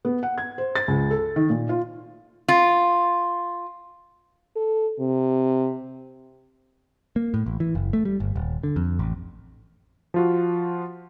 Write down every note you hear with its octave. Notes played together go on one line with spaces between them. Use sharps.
B3
F#5
G#6
C5
A6
C#2
A4
D#3
A#2
F4
F4
A4
C3
A#3
A2
A1
E3
F#1
A3
G3
G1
D#1
D3
F2
A1
F3 F4 F#4